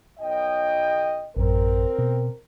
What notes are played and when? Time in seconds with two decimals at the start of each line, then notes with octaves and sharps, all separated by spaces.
0.19 B1 D#5 G5
1.37 A1 F#2 C4 A#4
1.99 B2